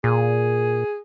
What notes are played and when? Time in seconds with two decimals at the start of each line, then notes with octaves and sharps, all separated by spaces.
0.04 A#2 G#4